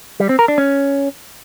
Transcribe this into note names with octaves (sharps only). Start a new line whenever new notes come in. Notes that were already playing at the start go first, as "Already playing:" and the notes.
G3
C4
A#4
D4
C#4